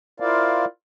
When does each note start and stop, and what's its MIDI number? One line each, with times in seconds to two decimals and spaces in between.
0.20 0.65 64
0.20 0.65 65
0.20 0.65 70
0.20 0.65 72
0.20 0.65 74
0.20 0.65 77